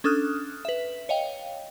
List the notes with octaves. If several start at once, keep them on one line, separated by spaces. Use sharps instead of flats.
C#4 D4 A4 D#6 F6 F#6
B4 E5
C#5 D#5 F5 G5